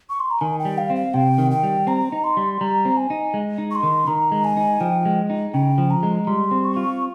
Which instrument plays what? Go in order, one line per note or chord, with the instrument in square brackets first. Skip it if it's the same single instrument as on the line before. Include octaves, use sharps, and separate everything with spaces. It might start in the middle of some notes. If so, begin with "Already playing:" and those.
[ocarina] C#6
C6
A#5
[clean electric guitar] D#3 [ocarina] G#5
[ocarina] G5
[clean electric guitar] G3
[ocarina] F5
[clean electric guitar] C4
[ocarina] F5
[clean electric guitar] C3 [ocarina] G5
[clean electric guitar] D#3
[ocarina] G5
[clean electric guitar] G3
[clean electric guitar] C4 [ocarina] A#5
[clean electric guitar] D#4
[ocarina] C6
[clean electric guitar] G3
[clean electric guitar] G3 [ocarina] A#5
[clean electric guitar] C4
[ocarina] G#5
[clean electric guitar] D#4
G#3
D#4
[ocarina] C#6
C6
[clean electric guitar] D#3
[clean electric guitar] D#3 [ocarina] A#5
[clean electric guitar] G#3
[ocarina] G#5
[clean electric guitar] D#4
[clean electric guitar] F3 [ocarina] G5
[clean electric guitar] G#3
D#4
[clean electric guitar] C#3 [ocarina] G5
[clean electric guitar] F3
[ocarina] A#5
[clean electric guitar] G#3
[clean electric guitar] G3 [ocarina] C6
[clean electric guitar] C4
[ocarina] C#6
[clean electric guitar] F4